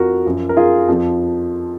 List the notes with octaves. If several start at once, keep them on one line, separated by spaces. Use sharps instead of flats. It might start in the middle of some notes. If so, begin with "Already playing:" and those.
Already playing: F2 F3 F#4 A#4
F#2 F3
A#4
F4 G#4
F2 F3